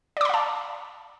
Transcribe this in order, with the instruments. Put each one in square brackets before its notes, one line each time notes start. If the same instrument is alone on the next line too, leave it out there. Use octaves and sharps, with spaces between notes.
[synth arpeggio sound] D5
D6
B5
F5
A5